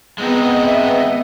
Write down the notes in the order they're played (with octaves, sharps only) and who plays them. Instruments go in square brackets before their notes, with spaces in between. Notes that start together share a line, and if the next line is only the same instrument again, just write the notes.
[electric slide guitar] G#3 C4 D#4 [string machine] B3 D#5
[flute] E5